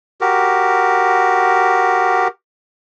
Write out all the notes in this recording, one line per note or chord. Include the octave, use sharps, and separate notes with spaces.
F#4 G4 A#4